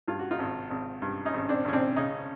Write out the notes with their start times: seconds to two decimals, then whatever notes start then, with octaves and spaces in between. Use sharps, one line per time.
0.08 G2 F4
0.19 F#4
0.31 D#4 F4
0.39 G#1
0.70 G#1
1.02 G2
1.25 C#4 D#4
1.34 G#1
1.49 C4 D4
1.65 G#1 C#4
1.73 C4 D4
1.96 C#3 C#4 D#4